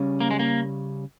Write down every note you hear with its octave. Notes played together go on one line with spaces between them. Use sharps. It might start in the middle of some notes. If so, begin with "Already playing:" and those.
Already playing: C#3 G3 C#4
A#3
G#3
A#3